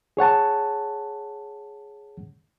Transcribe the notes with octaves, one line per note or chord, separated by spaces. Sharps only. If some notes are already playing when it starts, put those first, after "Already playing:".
G#4 C#5 F#5 A5